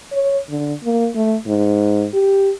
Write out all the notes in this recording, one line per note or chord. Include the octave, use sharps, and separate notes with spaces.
C#5
D3
A#3
A3
G#2
G4